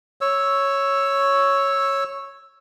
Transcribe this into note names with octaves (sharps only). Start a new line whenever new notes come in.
C#5 E6